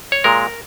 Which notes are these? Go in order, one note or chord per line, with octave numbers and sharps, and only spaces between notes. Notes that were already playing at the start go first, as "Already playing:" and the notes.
C#5
A#2 G#3 A#4